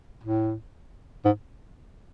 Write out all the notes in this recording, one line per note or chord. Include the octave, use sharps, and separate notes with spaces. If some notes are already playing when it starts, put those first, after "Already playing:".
A2
G#2